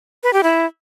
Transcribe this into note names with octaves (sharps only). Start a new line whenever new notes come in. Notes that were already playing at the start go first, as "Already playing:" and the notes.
B4
G4
E4